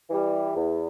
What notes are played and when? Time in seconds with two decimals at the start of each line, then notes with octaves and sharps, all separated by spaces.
0.08 E3 G3
0.55 E2